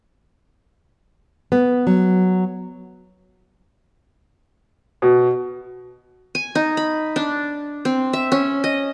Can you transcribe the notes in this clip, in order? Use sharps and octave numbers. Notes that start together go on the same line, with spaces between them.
B3
F#3
B2
G#5
D#4
B5
D4
C4
E5
C#4
D#5